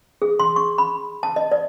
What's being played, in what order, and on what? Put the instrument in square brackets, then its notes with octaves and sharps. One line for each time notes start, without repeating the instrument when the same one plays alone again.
[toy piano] G#4
C6
C#6
B5
A5
D#5
D5